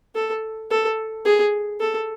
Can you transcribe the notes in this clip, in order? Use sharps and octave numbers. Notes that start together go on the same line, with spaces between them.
A4
A4
G#4
A4